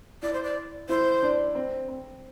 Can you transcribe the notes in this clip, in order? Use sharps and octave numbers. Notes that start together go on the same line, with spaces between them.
E4 D5
C5
D5
E4 C5
D4
C4
C4